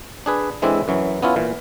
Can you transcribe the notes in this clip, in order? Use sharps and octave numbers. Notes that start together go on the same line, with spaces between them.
D4 G#4 B4
E3 G#3 C4 D4 E4 A4
F#2 E3 F#3
B3 C#4 E4 F4
A#2 E3